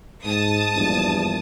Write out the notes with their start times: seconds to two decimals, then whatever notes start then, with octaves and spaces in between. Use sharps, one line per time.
0.24 G#2 A5 D#6
0.73 A#1 E2 G2